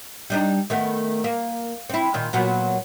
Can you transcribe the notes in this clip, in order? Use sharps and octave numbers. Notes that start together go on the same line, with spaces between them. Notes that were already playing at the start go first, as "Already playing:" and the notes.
G3 D4 D#4
D#3 A3 B3
A#3
C4 E4
A#2 D#3
A#2 F#3 B3